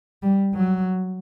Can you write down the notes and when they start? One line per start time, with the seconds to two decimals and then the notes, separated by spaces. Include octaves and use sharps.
0.22 G3
0.54 F#3